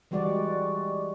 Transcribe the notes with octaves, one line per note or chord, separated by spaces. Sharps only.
E3 G3 G#3 F#4 D5